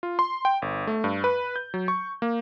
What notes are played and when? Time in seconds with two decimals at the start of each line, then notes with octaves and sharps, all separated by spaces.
0.03 F4
0.19 C6
0.45 G5
0.62 G1
0.87 A3
1.04 G2
1.24 B4
1.56 G6
1.74 F#3
1.88 C#6
2.22 A#3